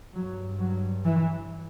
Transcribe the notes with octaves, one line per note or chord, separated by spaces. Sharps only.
G2 F#3
F#3
E3